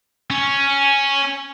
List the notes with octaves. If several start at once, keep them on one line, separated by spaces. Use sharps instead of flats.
C#4